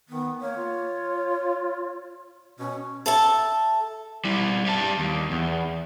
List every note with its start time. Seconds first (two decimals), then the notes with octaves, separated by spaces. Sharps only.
0.09 D#3 B3
0.41 A#3 C#5
0.57 F4
2.59 B2 C#4
3.06 A4 E5 A5
4.25 G3 E4
4.65 G3 A5
4.99 D#2
5.31 E2